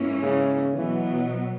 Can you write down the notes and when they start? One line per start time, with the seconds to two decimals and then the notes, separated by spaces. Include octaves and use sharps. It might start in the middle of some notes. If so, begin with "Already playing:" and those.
Already playing: G#2 E3 A#3 C#4
0.22 C#3
0.75 B2 E3 F#3 B3